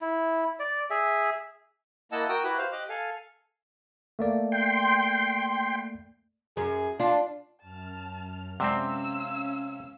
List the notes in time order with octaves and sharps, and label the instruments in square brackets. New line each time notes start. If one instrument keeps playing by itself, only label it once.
[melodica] E4
D5
G#4 E5
[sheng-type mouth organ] A#3 E4 D#5 F#5 A5 E6
F#4 A#4 G5 D#6 E6
E4 F#4 G4 B4 F#6
C5 F5
G4 D#5 D6 F#6
A4 F5 G#5
[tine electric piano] A3 A#3 D5
[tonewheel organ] G5 C6
[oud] F#2 [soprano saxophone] G#4
[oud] D4 [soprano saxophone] F4
[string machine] F#2 F6 [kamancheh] A5
[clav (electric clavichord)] C3 C4 [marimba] G#3 D5 F#5 [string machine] C#4 [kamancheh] F5 E6